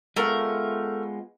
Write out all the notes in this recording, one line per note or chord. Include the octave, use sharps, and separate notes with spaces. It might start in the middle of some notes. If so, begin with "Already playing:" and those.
G#3 A3 B3 F4 A#4